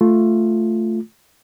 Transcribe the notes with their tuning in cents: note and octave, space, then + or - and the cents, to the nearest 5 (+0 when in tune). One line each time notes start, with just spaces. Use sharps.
A3 +5 F4 +0